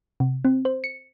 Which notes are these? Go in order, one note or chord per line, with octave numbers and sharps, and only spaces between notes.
C3
C4
C5
C#7